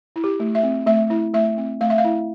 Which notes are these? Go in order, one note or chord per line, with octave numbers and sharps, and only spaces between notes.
E4
G4
A3
E5
C4
A3 E5
E4
A3 E5
C4
A3 F5
E5
F5
E4